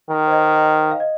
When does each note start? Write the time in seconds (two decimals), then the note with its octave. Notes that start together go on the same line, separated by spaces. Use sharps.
0.09 D#3
0.27 C5
0.31 D#5
0.91 F5
1.00 D#5